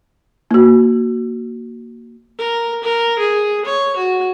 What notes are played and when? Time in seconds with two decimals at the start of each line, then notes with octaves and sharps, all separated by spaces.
0.51 A#3 F#4
2.38 A#4
2.83 A#4
3.19 G#4
3.65 C#5
3.96 F#4